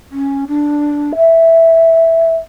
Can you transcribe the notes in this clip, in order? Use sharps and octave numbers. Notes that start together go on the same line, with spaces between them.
C#4
D4
E5